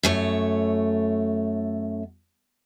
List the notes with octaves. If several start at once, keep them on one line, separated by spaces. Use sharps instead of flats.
F#2 A3 C#5